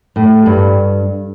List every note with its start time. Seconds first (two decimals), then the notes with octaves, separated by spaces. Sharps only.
0.16 A2
0.46 G2